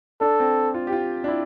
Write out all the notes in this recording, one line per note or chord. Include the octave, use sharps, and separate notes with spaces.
D4 A4
C4
F4
G4
F4
D4
E4